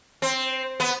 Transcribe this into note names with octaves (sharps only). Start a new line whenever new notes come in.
C4
B3